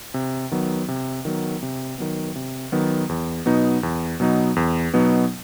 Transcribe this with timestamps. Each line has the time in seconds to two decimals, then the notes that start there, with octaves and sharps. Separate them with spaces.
0.14 C3
0.51 D#3 F#3 B3
0.88 C3
1.25 D#3 F#3 B3
1.63 C3
1.98 D#3 F#3 B3
2.36 C3
2.72 D#3 F#3 B3
3.09 E2
3.46 B2 F#3 B3 D#4
3.83 E2
4.20 B2 F#3 B3 D#4
4.56 E2
4.94 B2 F#3 B3 D#4